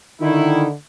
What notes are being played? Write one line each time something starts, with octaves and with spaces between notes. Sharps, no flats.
D3 D#3 D#4 E4